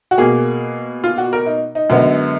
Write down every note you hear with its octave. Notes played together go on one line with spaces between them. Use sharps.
F#4
B2 A#3 G#4
F4
F#4
A#4
D#4
D#4
F#2 D3 G#3 B3